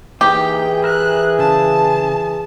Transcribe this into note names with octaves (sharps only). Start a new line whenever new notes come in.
E3 A#3 D#4 G4 G#4 G5
A#4 E5 F#6
C#3 A5